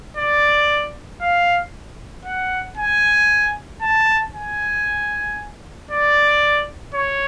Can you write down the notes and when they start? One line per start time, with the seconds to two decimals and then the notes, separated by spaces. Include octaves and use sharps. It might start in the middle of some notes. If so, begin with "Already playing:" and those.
0.17 D5
1.22 F5
2.25 F#5
2.78 G#5
3.82 A5
4.34 G#5
5.91 D5
6.94 C#5